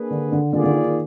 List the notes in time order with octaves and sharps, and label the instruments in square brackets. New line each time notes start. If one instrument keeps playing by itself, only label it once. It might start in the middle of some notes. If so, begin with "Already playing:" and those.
Already playing: [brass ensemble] A#3 D4 G#4 B4
[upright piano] D3
D3
[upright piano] D3 [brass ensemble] A#3 F4 G#4 D5
[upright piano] D3
D#3
D#3